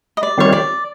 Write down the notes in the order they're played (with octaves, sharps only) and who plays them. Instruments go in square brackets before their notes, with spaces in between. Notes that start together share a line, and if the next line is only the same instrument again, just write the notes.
[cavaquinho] D#5
D5
[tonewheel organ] D#3 G3 C4 F4 [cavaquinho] C#5
[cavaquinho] D5